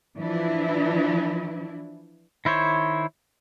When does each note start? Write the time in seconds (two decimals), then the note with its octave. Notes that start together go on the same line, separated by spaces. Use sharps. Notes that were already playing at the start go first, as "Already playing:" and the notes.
0.17 E3 F3 D4 E4
2.45 D#3 E4 C5 C#5